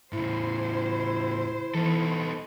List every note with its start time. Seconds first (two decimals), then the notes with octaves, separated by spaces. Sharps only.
0.13 A2 C#3 E4 C5
1.75 E3 B3 D#4 A4